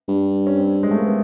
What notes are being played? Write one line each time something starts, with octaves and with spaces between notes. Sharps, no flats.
G2
C#4
C4
G#3
A3
A#3
B3